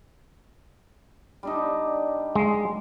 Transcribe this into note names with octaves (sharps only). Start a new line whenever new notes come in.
G3 D4 D#4
G#3